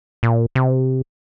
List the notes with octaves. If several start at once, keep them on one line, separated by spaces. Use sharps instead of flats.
A#2
C3